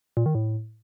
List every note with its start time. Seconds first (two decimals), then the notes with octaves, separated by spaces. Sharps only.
0.17 A#2
0.26 D#3
0.35 A2